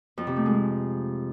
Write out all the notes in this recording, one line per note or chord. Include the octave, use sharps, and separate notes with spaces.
F2
C3
A3
G#3